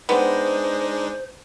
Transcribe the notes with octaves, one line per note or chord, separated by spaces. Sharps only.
G#3 B3 C4 D4 D#4 C5